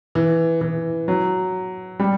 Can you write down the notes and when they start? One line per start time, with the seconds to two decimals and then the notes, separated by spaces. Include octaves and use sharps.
0.15 E3
0.61 E3
1.08 F#3
1.99 G3